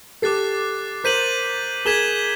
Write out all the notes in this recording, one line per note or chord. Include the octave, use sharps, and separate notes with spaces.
G4 A4 D6 F#6 A6 C7
A#4 C5 G6 B6 D#7 F#7
G#4 A#4 G#6 B6 E7 G7